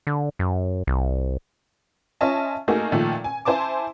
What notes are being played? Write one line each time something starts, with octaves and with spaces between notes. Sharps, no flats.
D3
F#2
C2
C#4 F4 D#5 E5 G#5 A5
A3 A#3 D#4 F#4 G#4 A#4
A#2 D#3 F3 A3
G#5
E4 C5 G#5 A5 D6